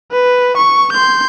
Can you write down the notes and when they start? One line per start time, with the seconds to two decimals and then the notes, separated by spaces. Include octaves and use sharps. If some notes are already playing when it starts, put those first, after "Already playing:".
0.12 B4
0.57 C#6
0.92 C6 G6